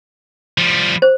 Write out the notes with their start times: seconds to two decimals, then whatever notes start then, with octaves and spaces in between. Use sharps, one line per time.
0.58 F3 G3
1.02 C5